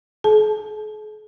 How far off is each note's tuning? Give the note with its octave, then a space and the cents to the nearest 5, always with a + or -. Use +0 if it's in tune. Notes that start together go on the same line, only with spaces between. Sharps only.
G#4 +45 A5 -35